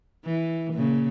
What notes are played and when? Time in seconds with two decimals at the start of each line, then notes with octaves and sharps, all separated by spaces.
0.25 E3
0.73 A#2 C#3